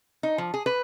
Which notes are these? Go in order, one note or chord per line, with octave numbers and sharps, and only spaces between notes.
D#4
F3
G#4
B4